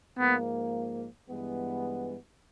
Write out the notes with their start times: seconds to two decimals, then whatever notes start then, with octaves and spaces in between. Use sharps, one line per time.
0.18 G#2 F3 A#3 B3
1.28 G2 E3 G#3 B3